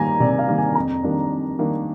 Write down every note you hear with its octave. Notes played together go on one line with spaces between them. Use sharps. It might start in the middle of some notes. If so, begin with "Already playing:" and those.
Already playing: D#3 G3 A#3 G#5 A#5
C3 D5
F5
D#3 G3 A#3
G#5
F2 A#5
D#3 G3 A#3 D4
F2
D#3 G3 A#3 D4